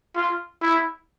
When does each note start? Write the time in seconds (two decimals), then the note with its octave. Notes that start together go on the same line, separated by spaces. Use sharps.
0.16 F4
0.62 E4